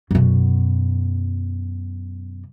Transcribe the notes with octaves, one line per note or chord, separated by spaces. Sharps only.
F#2 B2